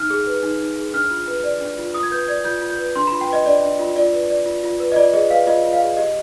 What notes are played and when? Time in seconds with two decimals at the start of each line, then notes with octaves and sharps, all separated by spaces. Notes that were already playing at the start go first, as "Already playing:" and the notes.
Already playing: D#4 F6
0.10 G#4
0.27 B4
0.43 D#4
0.60 D#4
0.78 G#4
0.93 D4 F6
1.11 F4
1.28 B4
1.44 D5
1.61 D4
1.78 F4
1.94 F4 D#6
2.03 G#6
2.11 B4 G6
2.28 D5 G#6
2.44 F4 G6
2.61 F4
2.70 G6
2.79 B4
2.96 D4 C6
3.07 B5
3.12 F4
3.21 G5
3.28 B4 D#5
3.46 D4 D5
3.63 D4
3.79 F4
3.96 F4 D5
4.13 B4
4.30 D5
4.46 F4
4.63 F4
4.80 B4
4.92 D#5
4.96 F4 D5
5.13 G#4 D#5
5.30 B4 F5
5.47 F4 D#5
5.64 F4
5.73 F5
5.81 G#4
5.97 G4 D#5